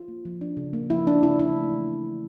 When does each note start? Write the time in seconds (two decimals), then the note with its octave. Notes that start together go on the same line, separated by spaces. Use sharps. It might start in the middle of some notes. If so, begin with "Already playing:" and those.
Already playing: F4
0.08 A#3
0.25 F3
0.41 D4
0.57 C#3
0.73 A#3
0.90 F3 E4
1.07 D4
1.22 C#3 E4
1.39 D4 E4
1.56 A3
1.72 E3
1.88 E3
2.05 D4